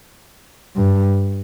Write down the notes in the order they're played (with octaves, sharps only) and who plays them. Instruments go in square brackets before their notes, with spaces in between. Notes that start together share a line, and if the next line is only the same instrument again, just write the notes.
[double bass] G2